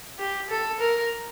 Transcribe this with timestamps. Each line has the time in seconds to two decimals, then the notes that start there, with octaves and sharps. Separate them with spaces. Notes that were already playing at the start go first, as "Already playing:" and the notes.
0.19 G4
0.50 A4
0.80 A#4